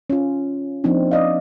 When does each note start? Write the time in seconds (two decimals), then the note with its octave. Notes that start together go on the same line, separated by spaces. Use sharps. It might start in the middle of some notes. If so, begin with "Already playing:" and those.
0.10 C#4 F4
0.84 F3 A#3 C4 D4 D#4
1.11 D5 D#5 F5